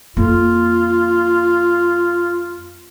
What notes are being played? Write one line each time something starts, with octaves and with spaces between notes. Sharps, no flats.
F2 A#3 F4